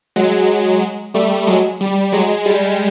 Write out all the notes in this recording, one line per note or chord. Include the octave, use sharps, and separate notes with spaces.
F#3 G#3
G3 A3
F#3 G#3
G3
F#3 G#3
G3